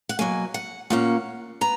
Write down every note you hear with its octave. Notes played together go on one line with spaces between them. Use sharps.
F#5
B2 F#3 A#3 G#5
F#5
A#2 A#3 C#4 F#5
B3 A#5